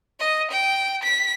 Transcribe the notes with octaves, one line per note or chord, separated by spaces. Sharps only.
D#5
G5
B6